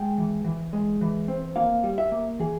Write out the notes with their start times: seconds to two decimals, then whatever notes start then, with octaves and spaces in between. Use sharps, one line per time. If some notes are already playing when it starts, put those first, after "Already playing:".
Already playing: G#3 G5
0.18 E3
0.45 E3
0.73 G#3
1.01 E3
1.28 C4
1.56 A#3 F5
1.83 G3
1.98 E5
2.12 A#3
2.39 E3 G#4